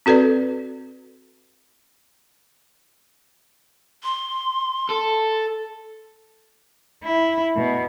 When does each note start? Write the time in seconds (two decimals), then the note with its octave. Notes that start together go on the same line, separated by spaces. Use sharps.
0.06 C4 F#4 A4 B4 D5
4.04 C6
4.90 A4
7.04 E4
7.56 B2